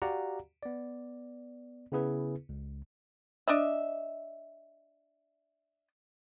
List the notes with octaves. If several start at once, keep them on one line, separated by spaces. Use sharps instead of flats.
F#4 G4 D5 F5 F#5 A#5
B3 D5
C#3 B3 E4 G#4 B4
C#2
D4 D#5 E5